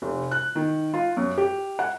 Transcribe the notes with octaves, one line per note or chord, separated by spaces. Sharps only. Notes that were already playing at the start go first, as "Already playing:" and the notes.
F1
F#6
D#3
F4
F#2
G4
F#5